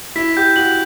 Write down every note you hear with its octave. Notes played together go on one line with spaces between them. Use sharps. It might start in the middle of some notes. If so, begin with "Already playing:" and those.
E4 B6
G4 G6
F#4 F#7